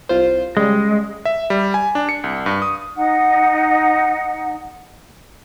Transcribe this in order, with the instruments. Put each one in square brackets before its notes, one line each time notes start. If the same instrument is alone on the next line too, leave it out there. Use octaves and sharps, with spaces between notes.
[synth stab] C2 F4 C5
[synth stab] C#3 G3 [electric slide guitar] G#3
[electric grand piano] E5
G3
G#5
D4
C#7
C2
G2
D#6
[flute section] D#4 F#5